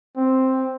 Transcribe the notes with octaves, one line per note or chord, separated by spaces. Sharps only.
C4